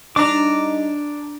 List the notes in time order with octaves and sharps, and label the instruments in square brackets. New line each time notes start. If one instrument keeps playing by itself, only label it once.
[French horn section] G3 D#4 [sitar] D4 [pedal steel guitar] A#5 D6